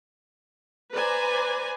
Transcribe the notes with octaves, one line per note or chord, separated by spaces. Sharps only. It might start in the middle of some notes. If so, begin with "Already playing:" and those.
B4 C5 D5 G#5 A#5